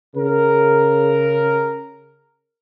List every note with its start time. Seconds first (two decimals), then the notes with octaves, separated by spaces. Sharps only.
0.16 C#3 A#4